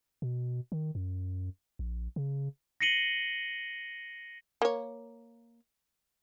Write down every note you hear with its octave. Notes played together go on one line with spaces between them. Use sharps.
B2
D#3
F#2
A#1
C#3
A#6 C7 C#7 D#7 F#7 G7
A#3 C#5